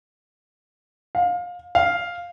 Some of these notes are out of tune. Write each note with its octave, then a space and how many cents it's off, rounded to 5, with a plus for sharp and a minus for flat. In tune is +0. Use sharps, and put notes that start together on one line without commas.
F5 +25
F5 +0